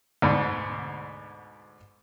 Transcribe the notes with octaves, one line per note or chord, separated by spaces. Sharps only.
D2 G#2 B2